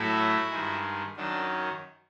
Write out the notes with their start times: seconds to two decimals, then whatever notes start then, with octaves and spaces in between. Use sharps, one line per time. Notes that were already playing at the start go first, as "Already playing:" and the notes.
Already playing: A2 F#3 A3 E4 F#4
0.50 G2 D#3 G#3
1.16 F#2 D#3 F#3 D4